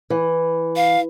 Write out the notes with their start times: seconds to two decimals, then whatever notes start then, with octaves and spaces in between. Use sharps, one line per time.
0.10 E3
0.76 F5